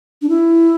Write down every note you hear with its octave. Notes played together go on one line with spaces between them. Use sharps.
D4
E4